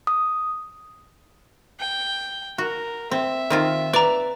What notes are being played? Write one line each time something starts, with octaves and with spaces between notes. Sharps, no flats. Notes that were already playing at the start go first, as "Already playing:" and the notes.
D#6
G5
F#4 A#4
C4 E5
D#3 C4 F4
B4 D5 A#5